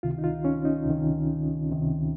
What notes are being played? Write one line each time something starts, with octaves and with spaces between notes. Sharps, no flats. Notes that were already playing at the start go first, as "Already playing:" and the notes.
C#2 C3 D#3 F4
D#4
F4
C#4
D#4
C#2 C3 D#3
C#2 C3 D#3